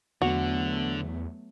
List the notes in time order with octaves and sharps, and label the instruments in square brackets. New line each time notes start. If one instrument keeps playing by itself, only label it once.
[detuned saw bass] E2 [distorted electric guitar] D3 [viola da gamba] F#3 A3 B3 [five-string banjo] F#4